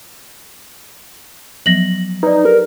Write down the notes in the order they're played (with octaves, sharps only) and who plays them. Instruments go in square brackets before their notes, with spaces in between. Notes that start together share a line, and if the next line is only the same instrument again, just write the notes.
[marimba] F3 F#3 B3 [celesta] A#6 F#7
[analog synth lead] D#4 [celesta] B4 D5
[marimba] G4 A4 [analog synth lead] A#4